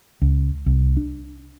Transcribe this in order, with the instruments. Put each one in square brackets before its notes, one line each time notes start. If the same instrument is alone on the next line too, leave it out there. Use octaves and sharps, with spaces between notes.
[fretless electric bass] C#2
C2
D4